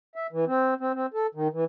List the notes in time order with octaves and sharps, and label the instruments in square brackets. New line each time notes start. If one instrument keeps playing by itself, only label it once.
[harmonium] E5
E3
C4
C4
C4
A4
D#3
E3